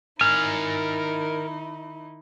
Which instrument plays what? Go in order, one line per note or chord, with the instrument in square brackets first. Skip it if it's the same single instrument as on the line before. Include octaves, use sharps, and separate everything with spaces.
[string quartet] D#3 D#4 E4 [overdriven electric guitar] A#4 G#5 [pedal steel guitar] F6